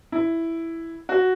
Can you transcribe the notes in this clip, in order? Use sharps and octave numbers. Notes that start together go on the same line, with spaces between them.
E4
F#4